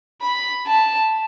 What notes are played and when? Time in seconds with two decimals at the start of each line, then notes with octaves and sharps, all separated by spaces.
0.22 B5
0.67 A5